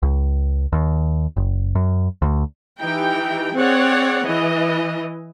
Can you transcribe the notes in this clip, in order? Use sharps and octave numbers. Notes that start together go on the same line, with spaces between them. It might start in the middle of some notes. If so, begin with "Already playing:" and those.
C#2
D#2
F#1
F#2
D2
E3 D#4 G4 G5
C4 G#4 C#5 D5 F#5
E3 D#5